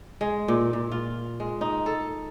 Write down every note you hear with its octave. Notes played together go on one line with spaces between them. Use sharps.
G#3
A#2
A#2
F4
G#3
D#4
A4